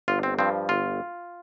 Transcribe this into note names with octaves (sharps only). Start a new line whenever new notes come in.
G1 F4
C4
G2 F3 C4
G1 F4